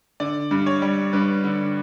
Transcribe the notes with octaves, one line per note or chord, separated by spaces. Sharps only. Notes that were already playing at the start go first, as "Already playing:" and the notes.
D3 D5
G2
C#5
G3
G2 B4
D3